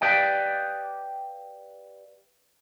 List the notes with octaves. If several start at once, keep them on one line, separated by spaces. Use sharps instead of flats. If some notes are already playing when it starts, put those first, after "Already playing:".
G4 B4 D5 D#5 F5 G5